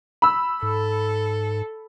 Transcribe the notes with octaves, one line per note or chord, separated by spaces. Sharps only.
B5 E6
G#2 A4